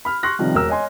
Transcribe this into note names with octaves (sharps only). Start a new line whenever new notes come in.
B5 F6
C6 C#6 F#6 A#6
C3 D#3 F3 G3
E1 A#4 E6
C#5 D#5 G#5 C6